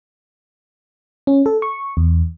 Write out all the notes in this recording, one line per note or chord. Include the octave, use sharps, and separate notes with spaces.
C#4
A4
C#6
E2